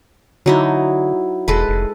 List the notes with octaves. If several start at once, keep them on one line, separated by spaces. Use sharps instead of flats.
D3 F#3 D#4 E4
E1 G#3 A4 B4
F1